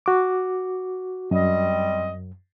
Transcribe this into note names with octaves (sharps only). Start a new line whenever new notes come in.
F#4 D6
F#2 G3 C4 D#5